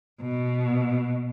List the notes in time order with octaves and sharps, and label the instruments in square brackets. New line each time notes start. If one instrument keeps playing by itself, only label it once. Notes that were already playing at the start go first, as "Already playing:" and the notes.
[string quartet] B2